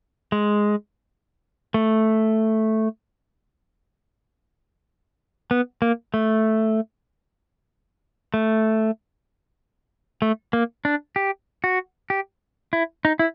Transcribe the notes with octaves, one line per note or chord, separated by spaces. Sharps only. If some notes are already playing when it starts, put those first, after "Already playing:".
G#3
A3
B3
A#3
A3
A3
A3
A#3
D4
G4
F#4
G4
E4
D#4
E4